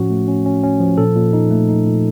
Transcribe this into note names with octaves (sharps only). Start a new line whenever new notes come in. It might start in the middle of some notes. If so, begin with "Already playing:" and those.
Already playing: A2 F3 C#4 F#4
A3
C#4
C#4
C#4
F3
A#2 A4
A#2
D#4
A3
D#4
A#2